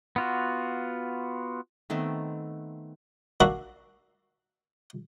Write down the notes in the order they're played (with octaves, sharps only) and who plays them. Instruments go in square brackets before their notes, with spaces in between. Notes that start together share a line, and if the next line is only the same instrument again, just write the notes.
[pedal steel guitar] B3 F4 F#4
[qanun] D#3 A3 B3 C4
[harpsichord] A#3 D4 F#4 E5